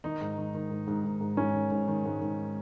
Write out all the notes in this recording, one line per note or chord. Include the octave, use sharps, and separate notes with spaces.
D#3 D#4
G#2
D#3
D#3
G#2
G#2
G#2
G#2
G#2 C#4
D#3
G#2
D#3
G#2
G#2